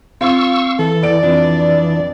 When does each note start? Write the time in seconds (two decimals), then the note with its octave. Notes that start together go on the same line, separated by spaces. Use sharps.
0.21 C4 F4 F5 C#6 E6
0.79 E3 A4
1.03 E2 D5 D7
1.23 F2 D4